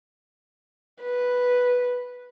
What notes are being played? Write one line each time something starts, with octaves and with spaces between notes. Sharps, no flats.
B4